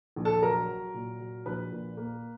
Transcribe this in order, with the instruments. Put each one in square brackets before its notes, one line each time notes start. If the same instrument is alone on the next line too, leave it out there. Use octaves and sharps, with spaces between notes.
[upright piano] A#1
A4 A5
F#3 A#4 A#5
F#3
A#2
F#3
A#1 B4 B5
A#2
A#3